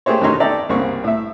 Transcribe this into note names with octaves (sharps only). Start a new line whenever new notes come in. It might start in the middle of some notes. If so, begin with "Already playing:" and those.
A3 A#3 G4 G#4 C5 C#5
E2 B2 D#3 D#4 C#5 C6
A4 D5 E5 G5 A#5
C2 C#3 A#3 C4 C#6
A2 E5